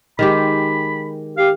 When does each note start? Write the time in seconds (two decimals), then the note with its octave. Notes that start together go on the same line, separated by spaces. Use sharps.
0.19 D#3 G#3 G4 B5
1.37 G4 F5